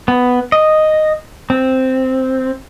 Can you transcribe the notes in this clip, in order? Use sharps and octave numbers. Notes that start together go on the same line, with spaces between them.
B3
D#5
C4